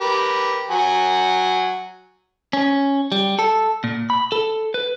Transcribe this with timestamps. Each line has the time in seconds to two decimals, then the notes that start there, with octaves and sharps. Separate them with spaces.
0.01 G4 A#4 B4
0.71 F#3 F#5 G#5
2.53 C#4
3.12 G3
3.39 A4
3.84 A#2
4.10 B5
4.32 A4
4.74 B4